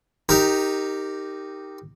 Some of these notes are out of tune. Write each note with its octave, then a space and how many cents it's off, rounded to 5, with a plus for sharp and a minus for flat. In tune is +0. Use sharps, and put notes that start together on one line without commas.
D#4 +0 G4 +0 A#4 -20